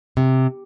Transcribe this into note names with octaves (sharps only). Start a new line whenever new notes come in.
C3